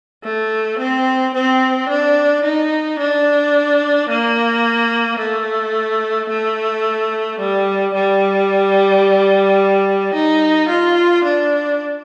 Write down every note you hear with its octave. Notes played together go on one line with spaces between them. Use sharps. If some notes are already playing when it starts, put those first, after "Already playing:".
A3
C4
C4
D4
D#4
D4
A#3
A3
A3
G3
G3
D#4
F4
D4